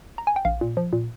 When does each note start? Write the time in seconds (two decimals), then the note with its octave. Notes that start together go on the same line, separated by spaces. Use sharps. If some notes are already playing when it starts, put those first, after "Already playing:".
0.18 A#5
0.27 G#5
0.36 G5
0.45 A#1 F5
0.61 A#2
0.77 F3
0.93 A#2